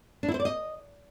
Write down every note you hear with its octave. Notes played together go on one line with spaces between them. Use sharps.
D4
E4
C5
D5
D#5